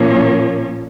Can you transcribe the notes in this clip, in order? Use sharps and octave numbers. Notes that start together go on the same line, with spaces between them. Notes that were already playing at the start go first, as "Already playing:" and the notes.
Already playing: A#2 F3 A#3 C#4